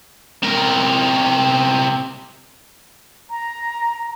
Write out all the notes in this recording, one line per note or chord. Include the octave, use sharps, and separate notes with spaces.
C3 A#4
A#5